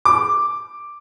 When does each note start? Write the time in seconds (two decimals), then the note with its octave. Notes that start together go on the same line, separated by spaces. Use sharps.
0.05 D6